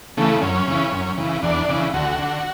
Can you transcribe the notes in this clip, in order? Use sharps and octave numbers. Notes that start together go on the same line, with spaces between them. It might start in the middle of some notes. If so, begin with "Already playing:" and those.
C#3 E3 A3
F#2 C#4
C#3 E3
F#2
C#3 E3
E2 D4
C#3 E3
D2 F#4
D3